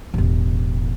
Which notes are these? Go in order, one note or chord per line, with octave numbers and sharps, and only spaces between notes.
E1 A1